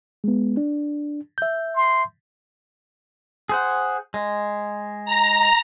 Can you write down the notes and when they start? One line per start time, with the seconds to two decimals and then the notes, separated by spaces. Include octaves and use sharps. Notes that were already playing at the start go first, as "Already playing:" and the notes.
0.24 G#3 B3
0.57 D4
1.38 E5 G6
1.75 C6
3.49 G#4 C5 F#5
4.14 G#3
5.05 A#5